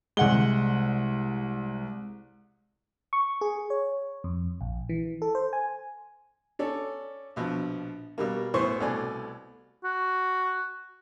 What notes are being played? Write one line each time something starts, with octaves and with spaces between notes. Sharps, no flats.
C2 G#3 F#5 G7
C#6
G#4
C#5
F2
A#1
E3
A4
C5
G#5
C#4 A4 D5
A#1 B2 F3
B2 G3 A#3
A1 B3 E4 C5 C6 C#6
C2 B2 A3 D5 G#5
F#4